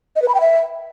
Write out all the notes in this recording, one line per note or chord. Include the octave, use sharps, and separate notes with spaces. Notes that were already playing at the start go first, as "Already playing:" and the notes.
D#5
B4
B5
G5
E5